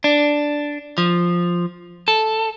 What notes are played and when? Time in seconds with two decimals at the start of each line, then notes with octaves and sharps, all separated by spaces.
0.04 D4
0.98 F3
2.08 A4